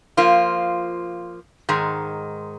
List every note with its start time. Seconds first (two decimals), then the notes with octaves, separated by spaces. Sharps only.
0.17 F3 A#3 F4
1.69 G#2 D#3 G#3